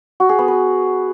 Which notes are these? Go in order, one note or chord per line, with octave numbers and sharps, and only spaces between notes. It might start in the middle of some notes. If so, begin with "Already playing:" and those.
F#4
G#4
B3
B4